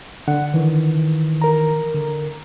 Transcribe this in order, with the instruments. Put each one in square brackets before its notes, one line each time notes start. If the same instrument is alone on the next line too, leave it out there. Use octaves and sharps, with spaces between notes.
[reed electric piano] D3 [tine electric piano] F#5
[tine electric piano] D#3 E3
[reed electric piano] A#4 A#5
[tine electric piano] D3